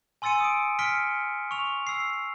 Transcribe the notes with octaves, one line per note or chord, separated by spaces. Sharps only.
G#5 C6 E6 A6 C#7 D#7
D#6 D7
F6 B6 C#7 D7 G7
C#6 F7
E6 C7